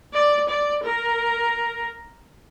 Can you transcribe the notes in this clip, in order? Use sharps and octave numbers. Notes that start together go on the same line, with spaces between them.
D5
D5
A#4